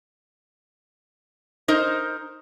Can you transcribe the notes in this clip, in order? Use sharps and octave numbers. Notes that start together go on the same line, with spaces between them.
D#4 A#4 C5